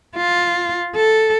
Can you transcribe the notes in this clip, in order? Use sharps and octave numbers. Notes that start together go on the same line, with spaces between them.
F4
A4